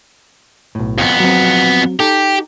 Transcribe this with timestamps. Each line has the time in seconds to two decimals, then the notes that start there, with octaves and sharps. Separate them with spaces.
0.75 B1 A2
0.98 F2 B3
1.20 F#3 C4
2.00 D#4 G4 A4